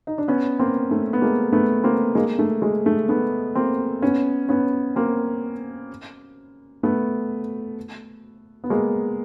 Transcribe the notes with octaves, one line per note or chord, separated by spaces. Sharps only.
D#4
D4
B3 C#4
A#3 C4
A3
B3
G#3 A#3
A3 B3
A#3 C4
G#3 A#3
A3
G#3
A3
A3 B3
A#3 C4
B3 C#4
B3 C#4
A#3 C4
A3 B3
B3
G#3 A#3